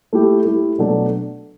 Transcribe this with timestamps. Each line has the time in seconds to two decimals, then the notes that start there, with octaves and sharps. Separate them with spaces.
0.13 A3 E4 G4
0.45 A3 E4 G4
0.78 B2 F#3 A3 D4 A4